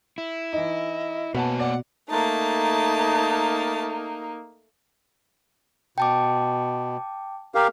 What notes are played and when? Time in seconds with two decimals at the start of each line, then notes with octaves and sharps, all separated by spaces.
0.18 E4
0.53 E3 D#4 D#5
1.35 B2 A#3 B4 C#5 F#5 G#5 A5
1.60 D5 F#5
2.09 A3 A#3 D#4 A5
5.98 B2 G5 A5 D6
7.55 G4 A#4 F5